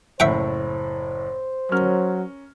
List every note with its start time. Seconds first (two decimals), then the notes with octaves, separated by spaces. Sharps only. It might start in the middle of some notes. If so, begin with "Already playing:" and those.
0.20 F#1 A2 C5 E5 F#5 G5
1.72 F#3 C#4 A#4 F6